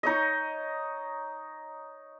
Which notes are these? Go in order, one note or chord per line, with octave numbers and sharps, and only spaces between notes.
D#4 C#5 D#5